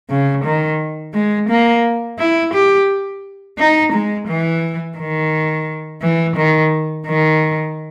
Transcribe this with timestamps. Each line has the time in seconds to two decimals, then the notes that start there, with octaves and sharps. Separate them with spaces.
0.10 C#3
0.44 D#3
1.14 G#3
1.49 A#3
2.19 E4
2.54 G4
3.58 D#4
3.93 G#3
4.28 E3
4.98 D#3
6.02 E3
6.36 D#3
7.07 D#3